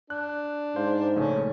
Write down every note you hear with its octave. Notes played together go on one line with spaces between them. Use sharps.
D4 F#6
G#2 C5 F5
A#1 C#3 A3 C#4